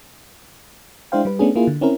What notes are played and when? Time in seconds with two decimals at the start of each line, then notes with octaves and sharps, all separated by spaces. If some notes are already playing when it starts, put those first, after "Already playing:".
1.12 G#3 D4 E4 C5 F5 G5
1.25 G3 B4
1.39 A3 B3 C#4 D4 G#4
1.56 A#3 E4 F4 G#4
1.67 D3
1.81 C4 C#4 E4 A#4